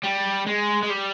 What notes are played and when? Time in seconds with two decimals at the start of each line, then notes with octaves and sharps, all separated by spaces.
0.04 G3
0.47 G#3
0.83 G#3
0.90 G3